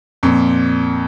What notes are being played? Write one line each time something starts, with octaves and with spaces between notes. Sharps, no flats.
F2 A#2